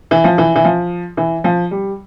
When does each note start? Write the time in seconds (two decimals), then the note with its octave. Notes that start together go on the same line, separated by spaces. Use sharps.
0.11 E3
0.24 F3
0.38 E3
0.56 E3
0.65 F3
1.17 E3
1.44 F3
1.71 G3